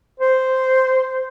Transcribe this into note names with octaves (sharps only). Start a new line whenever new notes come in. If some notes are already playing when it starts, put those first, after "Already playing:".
C5